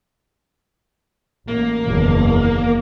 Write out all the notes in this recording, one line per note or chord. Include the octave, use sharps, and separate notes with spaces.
A1 A#3
F#1 E2 D#3